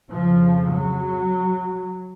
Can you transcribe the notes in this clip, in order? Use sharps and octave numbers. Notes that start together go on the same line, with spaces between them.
F2 C#3 F3
F#3